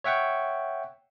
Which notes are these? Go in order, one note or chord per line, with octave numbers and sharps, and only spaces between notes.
C#5 E5 F#5 G5 C#6